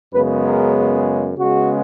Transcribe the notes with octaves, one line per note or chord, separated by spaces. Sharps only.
F#2 C#3 G#3 B3 B4
A#4
C#3 G#3 B3 F#4